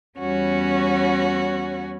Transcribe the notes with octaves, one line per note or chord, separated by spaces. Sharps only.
E2 G3 B3 C#4 F#4 C#5